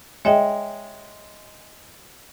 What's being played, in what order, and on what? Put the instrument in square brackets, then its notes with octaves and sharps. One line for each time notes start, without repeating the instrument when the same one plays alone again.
[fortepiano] G#3 [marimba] C#5 E5 G5